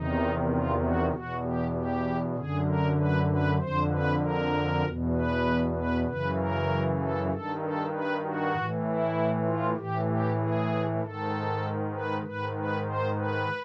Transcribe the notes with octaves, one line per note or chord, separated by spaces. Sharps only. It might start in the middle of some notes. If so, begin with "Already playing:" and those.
Already playing: E2 C3 D#3 D#4
F4
F#4
E2 B2 F#4
G4
G4
F#2 D3 G#4
A#4
B4
B4
F2 D3 C5
B4
A#4
E2 B2
B4
B4
F#2 C#3 E3 B4
A#4
A4
G2 D#3 A4
A4
B4
F#4
A2 E3
E4
F4
A2 E3 G4
G4
G#4
G#2 D#3 A4
B4
G#2 D#3 B4
B4
C5
B4